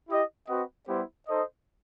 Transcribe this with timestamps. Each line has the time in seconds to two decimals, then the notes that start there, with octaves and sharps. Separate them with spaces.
0.09 E4 G4 D#5
0.48 C4 F#4 B4 D#5 F#5
0.88 G3 B3 E4 G4 C5
1.28 D#4 A4 C5 D#5